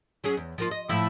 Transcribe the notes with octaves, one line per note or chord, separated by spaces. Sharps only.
F#3 C#4 G#4
E2
F3 A#3 F4
D#5
A2 F3 E4